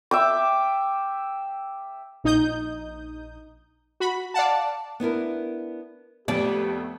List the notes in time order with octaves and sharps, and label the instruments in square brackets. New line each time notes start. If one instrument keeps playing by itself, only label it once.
[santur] E5 G5 D6
[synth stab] A#1 D#4 D#6 G6
F#4 B5
D5 F5 F#5 A5
[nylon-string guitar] B3 D4 E4 A#4
[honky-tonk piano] F2 [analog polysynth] A3 B3 [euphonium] G4 [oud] D5